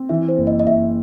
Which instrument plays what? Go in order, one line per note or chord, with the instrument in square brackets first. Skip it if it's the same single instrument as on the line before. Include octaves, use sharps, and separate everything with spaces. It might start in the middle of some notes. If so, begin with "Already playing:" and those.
Already playing: [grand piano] C4
[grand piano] E3 [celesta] E5
[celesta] C5
[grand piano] F#1
[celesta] D#5
D#5
[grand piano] F#1 [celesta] E5